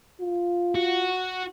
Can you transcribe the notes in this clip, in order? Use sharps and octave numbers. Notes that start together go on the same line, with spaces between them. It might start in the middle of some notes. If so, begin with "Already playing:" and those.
F4
F#4